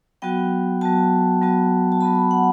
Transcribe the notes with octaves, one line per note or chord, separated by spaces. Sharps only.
F#3 B3 F#4 G5
F#3 B3 F#4 A5
F#3 B3 F#4
A5
F#3 B3 F#4 B5
B5
F#5